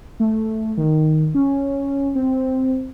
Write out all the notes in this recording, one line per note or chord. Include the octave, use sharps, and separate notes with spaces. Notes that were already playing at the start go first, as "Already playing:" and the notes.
A3
D#3
C#4
C4